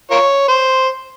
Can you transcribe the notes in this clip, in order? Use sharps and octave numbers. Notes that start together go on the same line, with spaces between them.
F4 A#4 C#5
C5